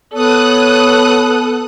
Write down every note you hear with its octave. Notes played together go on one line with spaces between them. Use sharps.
B3 A4 C#5 D#6 F#6